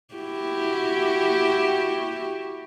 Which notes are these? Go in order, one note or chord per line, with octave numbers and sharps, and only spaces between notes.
E4 F#4 G4